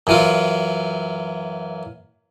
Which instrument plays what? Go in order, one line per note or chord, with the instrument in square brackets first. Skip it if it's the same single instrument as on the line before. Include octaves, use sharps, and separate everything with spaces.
[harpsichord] F#2 E3 F4